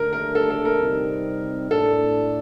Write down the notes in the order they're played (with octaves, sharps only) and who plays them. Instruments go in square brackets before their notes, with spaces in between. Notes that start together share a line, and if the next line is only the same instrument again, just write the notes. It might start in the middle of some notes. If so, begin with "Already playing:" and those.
Already playing: [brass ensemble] D3 A3 D4 [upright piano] A#4
[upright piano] A#4
A4
A4
A#4
[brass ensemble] C3 G3 C4 D#4
[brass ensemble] A2 A3 D4 [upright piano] A4